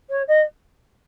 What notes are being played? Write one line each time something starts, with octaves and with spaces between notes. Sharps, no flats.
C#5
D#5